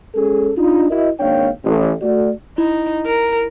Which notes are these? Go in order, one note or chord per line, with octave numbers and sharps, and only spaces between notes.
G#3 C#4 G#4 A4
D4 D#4 F4
E4 F#4 A#4 D#5
G#1 A#3 D4 C#5 F5 G5
A1
A3 F#4 D5
D#4 E4
A#4